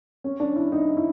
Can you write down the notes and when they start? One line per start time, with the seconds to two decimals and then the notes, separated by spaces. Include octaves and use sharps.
0.24 C#4
0.40 D4
0.56 E4
0.72 D#4
0.97 E4